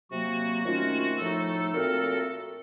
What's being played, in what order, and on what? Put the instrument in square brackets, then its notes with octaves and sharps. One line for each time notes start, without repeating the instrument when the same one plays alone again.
[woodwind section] C3 F#3 A#3 [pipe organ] F#4
[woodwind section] C3 D#3 A3 C#4 F4 [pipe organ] F#4
[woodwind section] A2 F3 A3 D#4 [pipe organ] A4
[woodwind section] A#2 A3 C4 F#4 A#4 [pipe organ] A4